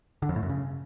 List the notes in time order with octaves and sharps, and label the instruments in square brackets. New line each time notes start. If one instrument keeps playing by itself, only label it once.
[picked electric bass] D3
F2
A2
F#2
C#3